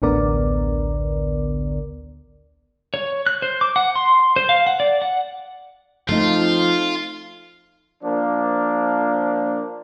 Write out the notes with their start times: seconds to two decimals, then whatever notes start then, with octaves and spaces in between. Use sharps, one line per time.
0.02 A1 D2 D3 B3 A#4 D5
2.94 C#5
3.27 F#6
3.42 C5
3.61 D6
3.76 F#5
3.96 C6
4.36 C5
4.49 F5
4.67 F#5
4.80 D5
5.02 F#5
6.09 F3 A3 C4 D#4 F4
8.03 F3 A#3 D4